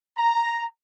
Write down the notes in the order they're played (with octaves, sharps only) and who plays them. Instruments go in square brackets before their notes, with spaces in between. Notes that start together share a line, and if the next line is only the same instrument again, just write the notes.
[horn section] A#5